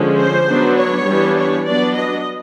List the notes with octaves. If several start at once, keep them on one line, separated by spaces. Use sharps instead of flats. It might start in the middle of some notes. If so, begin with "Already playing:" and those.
Already playing: D3 F3 G#3 C#4
C5
F#3 B3 D4
C#5
E3 G3 B3 D4
C#5
F#3 B3 D4 D5
D#5